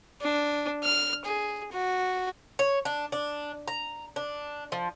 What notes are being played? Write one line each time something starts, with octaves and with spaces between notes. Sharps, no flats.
D4
F6
G#4
F#4
C#5
D4
D4
A#5
D4
F3